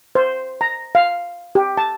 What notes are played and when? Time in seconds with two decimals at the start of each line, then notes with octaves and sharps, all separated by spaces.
0.15 C5
0.61 A#5
0.95 F5
1.55 G4
1.77 A5